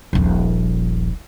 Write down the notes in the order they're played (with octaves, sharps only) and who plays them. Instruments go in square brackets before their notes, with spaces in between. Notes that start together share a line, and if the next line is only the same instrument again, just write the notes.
[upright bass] D#1 A#1